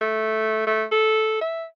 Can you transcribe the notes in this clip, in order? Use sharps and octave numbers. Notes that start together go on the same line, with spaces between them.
A3
A3
A4
E5